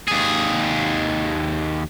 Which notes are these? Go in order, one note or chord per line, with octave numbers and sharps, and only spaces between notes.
D#2 G#4